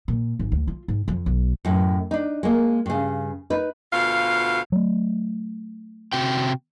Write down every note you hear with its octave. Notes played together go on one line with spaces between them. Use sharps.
A#2
G#1
D2
F4
G#2
F2
B1
F#2 A2
D4 D#4
G#3 A#3
G2 C#3
D#4 B4
D2 B2 F4 F5
F#3 A3
C3 F#4 G5